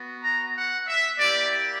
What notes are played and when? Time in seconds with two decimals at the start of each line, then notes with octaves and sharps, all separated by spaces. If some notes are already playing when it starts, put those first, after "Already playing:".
Already playing: B3 F#4
0.23 A#5
0.56 F#5
0.88 E5
1.19 A#3 E4 G4 D5